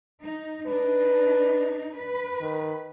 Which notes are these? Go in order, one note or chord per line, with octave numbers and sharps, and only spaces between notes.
D#4
D4 D#4 B4
B4
D#3